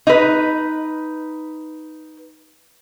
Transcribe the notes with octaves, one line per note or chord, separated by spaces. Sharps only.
D#4 B4